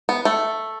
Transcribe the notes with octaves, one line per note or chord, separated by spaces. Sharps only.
B3
A3